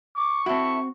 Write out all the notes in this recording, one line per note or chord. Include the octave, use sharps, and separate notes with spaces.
C#6 D6
C4 E4 F#4 A4 E5